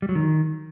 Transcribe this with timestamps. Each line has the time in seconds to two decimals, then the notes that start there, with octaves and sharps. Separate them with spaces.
0.02 G3
0.09 F#3
0.15 D#3